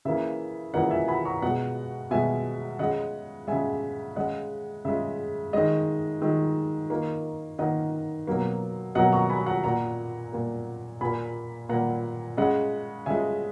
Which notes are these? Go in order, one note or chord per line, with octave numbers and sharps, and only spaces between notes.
C#3 E3 A#3 E5
C#3 E3 A#3 D#5 F#5
E5 G#5
G#5 B5
A#5 C#6
B2 G#3 F#5 A#5
B2 G#3 E5 G#5
C#3 G#3 D#5 F#5
C#3 G#3 E5 G#5
C#3 G#3 D#5 F#5
C#3 G#3 E5
D#3 G#3 D#5
D#3 G#3
D#3 A#3
D#3 A#3 D#5 F#5
B2 F#3 A#3
B2 F#3 A#3 D#5 F#5
A#5 C#6
G#5 B5
F#5 A#5
A#2 A#3 F#5 A#5
A#2 A#3
A#2 A#3 G#5 B5
A#2 A#3 F#5 A#5
C#3 G#3 D#5 F#5
C#3 G#3 E5 G#5